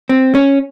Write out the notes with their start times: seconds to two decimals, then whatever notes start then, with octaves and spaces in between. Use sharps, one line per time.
0.09 C4
0.35 C#4